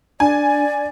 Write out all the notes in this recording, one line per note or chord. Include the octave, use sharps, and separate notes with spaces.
D4 D5 G#5